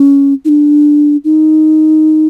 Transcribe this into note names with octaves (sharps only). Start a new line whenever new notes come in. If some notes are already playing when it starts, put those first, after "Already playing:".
Already playing: C#4
D#4
D4
D#4